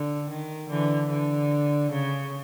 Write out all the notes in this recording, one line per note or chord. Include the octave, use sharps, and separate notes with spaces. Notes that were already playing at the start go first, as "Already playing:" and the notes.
Already playing: D3
D#3
D3 E3
D3
C#3